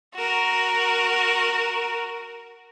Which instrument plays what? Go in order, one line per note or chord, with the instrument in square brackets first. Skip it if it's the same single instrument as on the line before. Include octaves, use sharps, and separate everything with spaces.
[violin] F#4 A#4